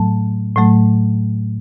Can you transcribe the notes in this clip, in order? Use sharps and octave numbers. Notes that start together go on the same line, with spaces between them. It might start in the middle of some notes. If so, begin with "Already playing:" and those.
Already playing: A2 F#3 A3 A5
A2 F#3 A3